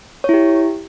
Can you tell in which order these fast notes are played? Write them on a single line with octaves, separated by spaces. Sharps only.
C#5 E4 G4